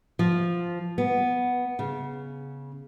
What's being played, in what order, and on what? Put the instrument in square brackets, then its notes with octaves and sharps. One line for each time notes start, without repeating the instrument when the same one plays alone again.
[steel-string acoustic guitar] F3
B3
C#3